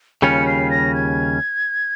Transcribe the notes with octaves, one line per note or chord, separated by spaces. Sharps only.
D#2 C#3 G3 C#4 F4 C#7
C7
A#6
G#6